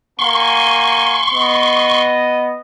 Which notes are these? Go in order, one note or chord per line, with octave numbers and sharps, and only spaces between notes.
A#3 F#5 G#5 C6 C#6
B3 D#5